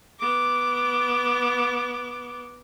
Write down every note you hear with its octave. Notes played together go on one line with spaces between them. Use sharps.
B3 D6